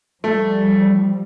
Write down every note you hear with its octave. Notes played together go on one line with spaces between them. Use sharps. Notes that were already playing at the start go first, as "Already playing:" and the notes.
F3 G3 A3